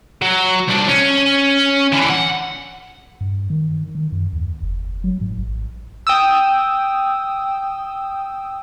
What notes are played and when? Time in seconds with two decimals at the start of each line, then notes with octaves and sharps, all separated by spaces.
0.22 F#3
0.68 C2 D4
0.89 C#4
1.92 D3 E3
2.10 F#5
3.21 G2
3.50 D#3
3.95 D#3
4.12 F#2
4.33 D#2
4.63 F#1
5.04 F#3
5.21 G#2
5.38 A1
6.07 G5 D#6 E6